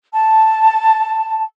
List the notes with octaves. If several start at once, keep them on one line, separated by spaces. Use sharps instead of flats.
A5